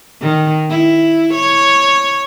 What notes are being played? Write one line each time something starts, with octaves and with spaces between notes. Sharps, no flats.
D#3
E4
C#5